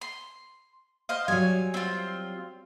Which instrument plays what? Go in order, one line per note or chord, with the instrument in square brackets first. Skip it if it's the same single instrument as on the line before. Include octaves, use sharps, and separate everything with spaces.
[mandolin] C6
C5 D#5 F5
[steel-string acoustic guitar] F#3 G3 [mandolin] G#5
[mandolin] C4 F4